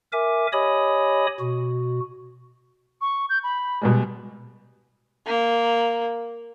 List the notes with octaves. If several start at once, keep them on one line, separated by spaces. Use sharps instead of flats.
A#4 E5 G#5 D6
G4 C#5 D#5 G#5 B5 D#6
B2 F#4
C#6
G6
B5
B2 G3 G#3
A#3